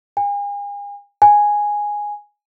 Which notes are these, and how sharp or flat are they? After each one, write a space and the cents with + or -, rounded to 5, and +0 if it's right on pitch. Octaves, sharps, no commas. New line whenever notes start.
G#5 -40
G#5 -5